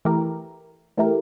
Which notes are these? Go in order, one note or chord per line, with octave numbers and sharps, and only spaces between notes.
E3 A3 E4 G4 A#4
E3 A3 E4 G4 A#4